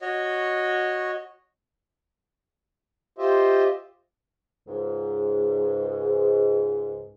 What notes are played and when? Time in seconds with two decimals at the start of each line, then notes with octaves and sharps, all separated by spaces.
0.01 F#4 C#5 D#5
3.18 F4 G4 C5 D#5 E5
4.67 C#2 G#2